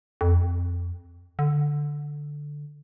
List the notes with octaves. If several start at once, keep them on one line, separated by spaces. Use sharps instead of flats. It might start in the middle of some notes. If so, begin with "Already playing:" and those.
F2
D3